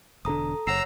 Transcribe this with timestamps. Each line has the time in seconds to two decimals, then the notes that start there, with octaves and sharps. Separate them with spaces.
0.25 E1 D3 A4 A#5 D#6
0.67 F#1 C#5 F#5 A#5 E6 C7